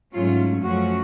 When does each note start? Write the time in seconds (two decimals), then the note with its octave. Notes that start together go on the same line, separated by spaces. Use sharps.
0.13 G#2 F#3 A3 C#4 F4
0.63 F#2 F3 A3 C#4 F#4